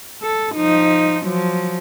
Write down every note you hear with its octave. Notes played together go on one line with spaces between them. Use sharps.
A4
F3 D#4
F3 F#3